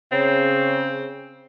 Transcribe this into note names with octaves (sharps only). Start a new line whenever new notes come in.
C#3 C4